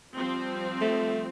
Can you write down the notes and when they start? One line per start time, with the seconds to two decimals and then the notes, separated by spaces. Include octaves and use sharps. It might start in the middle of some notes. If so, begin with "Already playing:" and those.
0.17 F3 G3 C4
0.81 A3